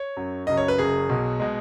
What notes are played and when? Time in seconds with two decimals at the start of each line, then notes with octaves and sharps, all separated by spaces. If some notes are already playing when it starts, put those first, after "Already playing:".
Already playing: C#5
0.16 F#2 F#3
0.47 F#2 C#3 F#3 D#5
0.57 C#5
0.68 B4
0.78 F#1 F#2 C#3 F#3 G#4
1.09 B1 B2 F#3
1.40 B2 G#3